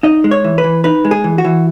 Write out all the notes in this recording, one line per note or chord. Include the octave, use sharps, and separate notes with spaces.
D#4 D#5
G#3
C#5
E3
B4
E3
D#4 B4
G#3
G#4
E3
F#4
E3